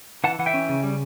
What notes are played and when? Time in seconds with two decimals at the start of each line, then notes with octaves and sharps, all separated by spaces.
0.24 E3 F#5 A5
0.39 E3 F#5
0.46 E5 G5
0.54 C#4
0.69 C#3
0.83 G3